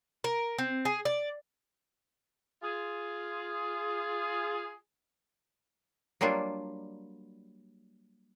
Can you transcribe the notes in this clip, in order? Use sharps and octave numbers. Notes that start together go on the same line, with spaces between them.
A#4
C4
G#4
D5
F4 G#4
F#3 G3 A#3 D4 F4